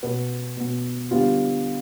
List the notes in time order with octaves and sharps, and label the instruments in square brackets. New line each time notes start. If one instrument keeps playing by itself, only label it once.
[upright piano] B2 B3 B4
B2 B3
D3 G3 B3 F4